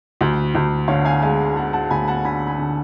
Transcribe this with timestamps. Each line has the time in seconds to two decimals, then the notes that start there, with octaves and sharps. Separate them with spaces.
0.21 D2
0.55 D2
0.88 D3 C#5 F5
1.05 F5 G#5
1.22 G#3 F5 G#5
1.56 G#3 F#5 A5
1.73 F#5 A5
1.90 D2 G#5 B5
2.08 F#5 A5
2.25 D3 G#5 B5
2.47 G#5 B5
2.58 D3